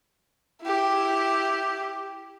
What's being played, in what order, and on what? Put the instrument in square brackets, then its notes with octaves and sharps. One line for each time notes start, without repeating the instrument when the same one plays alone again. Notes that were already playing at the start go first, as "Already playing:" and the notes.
[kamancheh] E4 G4